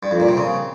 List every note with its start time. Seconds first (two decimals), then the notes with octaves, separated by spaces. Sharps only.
0.03 G2
0.11 F2
0.20 A#2
0.29 C3
0.37 C#3